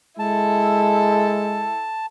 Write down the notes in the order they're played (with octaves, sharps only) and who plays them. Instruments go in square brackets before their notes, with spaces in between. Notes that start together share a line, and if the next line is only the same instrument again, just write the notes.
[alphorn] G#3 [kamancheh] E4 A4 [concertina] A5